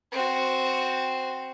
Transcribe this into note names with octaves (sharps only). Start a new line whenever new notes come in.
C4 F#4